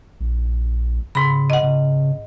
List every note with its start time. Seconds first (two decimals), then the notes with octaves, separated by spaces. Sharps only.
0.20 A#1
1.15 G#2 C#3 B5
1.50 D#5 F#5
1.63 C#3